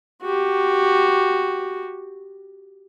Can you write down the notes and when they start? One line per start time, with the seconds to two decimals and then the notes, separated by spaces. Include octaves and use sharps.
0.23 F#4 G4